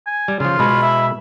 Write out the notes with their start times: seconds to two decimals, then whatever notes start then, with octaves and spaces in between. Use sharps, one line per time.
0.07 G#5
0.28 G3
0.40 C#3 F3 F4
0.59 B2 G#3 B5
0.82 E5